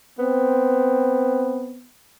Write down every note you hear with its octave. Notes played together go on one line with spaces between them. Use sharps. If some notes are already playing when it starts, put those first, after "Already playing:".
B3 C4